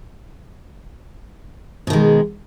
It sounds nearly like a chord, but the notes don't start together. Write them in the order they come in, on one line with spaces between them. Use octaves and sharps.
B2 D#3 G#3